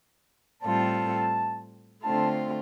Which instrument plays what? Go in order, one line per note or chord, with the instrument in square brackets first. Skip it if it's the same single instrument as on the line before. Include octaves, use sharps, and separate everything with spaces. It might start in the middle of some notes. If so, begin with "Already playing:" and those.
[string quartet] A2 G3 C4 F4 A4 [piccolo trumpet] A5
[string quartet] D3 A3 C4 F4 [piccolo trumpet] A5